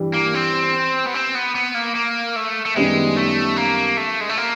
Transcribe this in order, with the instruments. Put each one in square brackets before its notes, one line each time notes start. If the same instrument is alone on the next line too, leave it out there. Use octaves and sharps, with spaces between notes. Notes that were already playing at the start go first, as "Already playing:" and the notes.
Already playing: [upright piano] G2 E3 G3
[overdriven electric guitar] A#3
C4
B3
C4
B3
B3
A#3
A#3
A3
A3
[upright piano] F#2 D#3 G3 B3 [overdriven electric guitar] G#3
[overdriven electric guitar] A3
A#3
A3
G#3
A3
A#3